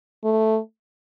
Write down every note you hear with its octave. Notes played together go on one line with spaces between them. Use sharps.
A3